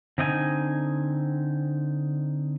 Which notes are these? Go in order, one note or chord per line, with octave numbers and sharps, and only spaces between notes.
D3 C4 D#4 D#5 G#5